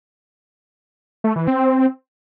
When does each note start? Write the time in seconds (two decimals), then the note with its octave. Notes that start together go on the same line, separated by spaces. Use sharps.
1.24 A3
1.36 E3
1.47 C4